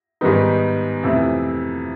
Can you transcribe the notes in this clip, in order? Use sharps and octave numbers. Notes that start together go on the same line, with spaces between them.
G#2 D#3 G3 B3 D#4
F2 C3 E3 A3